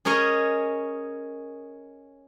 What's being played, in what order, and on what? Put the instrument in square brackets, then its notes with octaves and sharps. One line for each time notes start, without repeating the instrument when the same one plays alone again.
[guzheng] C#4 G#4 A#4 C#5 D#5